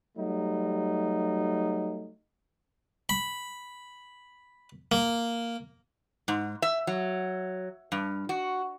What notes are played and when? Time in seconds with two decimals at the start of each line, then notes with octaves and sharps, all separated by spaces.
0.17 F#3 G3 A3 D#4
3.09 B5
4.92 A#3
6.28 G#2
6.62 E5
6.87 F#3
7.92 G2
8.29 F#4